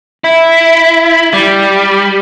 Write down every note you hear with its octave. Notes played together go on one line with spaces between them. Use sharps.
E4
G3